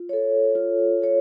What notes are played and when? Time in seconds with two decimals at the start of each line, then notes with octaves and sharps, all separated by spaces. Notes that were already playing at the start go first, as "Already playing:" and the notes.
Already playing: F4
0.09 A4 C#5
0.55 F4
1.02 A4 C#5